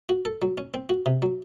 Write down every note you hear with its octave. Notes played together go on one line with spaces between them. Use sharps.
F#4
A4
F#3
C#4
C4
F#4
C3
F#3